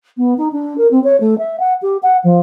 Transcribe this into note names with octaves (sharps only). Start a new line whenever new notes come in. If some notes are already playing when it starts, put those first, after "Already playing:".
B3
D#4
D4
A#4
C4
C#5
A3
E5
F#5
G4
F#5
F3